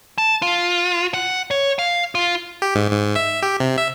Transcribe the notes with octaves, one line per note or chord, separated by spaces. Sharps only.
A5
F4
F#5
C#5
F5
F4
G4
G#2
G#2
E5
G4
C3
E5